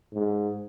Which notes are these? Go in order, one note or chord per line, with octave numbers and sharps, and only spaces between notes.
G#2